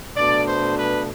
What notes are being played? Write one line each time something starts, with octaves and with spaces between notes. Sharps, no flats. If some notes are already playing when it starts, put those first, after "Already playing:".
B2 A3 D4 D5
C5
B4